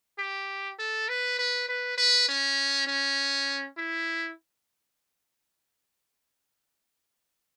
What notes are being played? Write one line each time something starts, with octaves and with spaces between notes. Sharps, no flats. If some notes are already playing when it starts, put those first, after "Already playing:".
G4
A4
B4
B4
B4
B4
C#4
C#4
E4